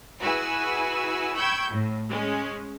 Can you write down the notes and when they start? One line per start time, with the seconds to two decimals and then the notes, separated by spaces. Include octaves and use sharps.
0.22 E4 F#4 G#4 B4 G#5 E6
1.37 G5 B5 C#6 E6 G6 G#6
1.70 A2
2.08 G#3 C#4